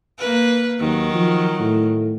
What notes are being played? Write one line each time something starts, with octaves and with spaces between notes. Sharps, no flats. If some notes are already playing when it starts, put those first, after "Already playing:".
A#3 B4
D#2 D#3 F#3
F3
A2